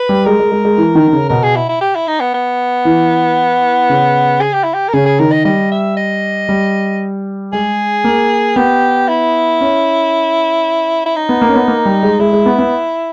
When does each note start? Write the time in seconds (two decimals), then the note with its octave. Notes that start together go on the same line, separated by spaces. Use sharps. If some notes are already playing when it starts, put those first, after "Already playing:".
Already playing: B4
0.09 G3
0.25 G#3 A#4
0.40 G#3
0.52 G#3
0.65 G#3
0.78 E3
0.95 D#3
1.08 D#3
1.13 C#3
1.29 B2 A#4
1.43 G#4
1.56 E4
1.69 E4
1.81 G4
1.95 E4
2.08 D#4
2.20 B3
2.34 B3
2.85 E3
3.89 C#3
4.41 G#4
4.53 G4
4.63 E4
4.74 G4
4.88 A#4
4.93 C#3 G#4
5.06 G#4
5.19 D#3 A#4
5.32 D#5
5.45 G3 D#5
5.72 E5
5.97 D#5
6.49 G3
7.53 G#3 G#4
8.04 A#3
8.56 B3 G4
9.08 E4
9.61 C#4
11.06 E4
11.16 D#4
11.29 B3
11.42 A#3
11.49 C#4
11.55 B3
11.68 A#3
11.85 G3
12.03 G#3
12.19 G#3 E4
12.33 G#3
12.46 B3
12.59 B3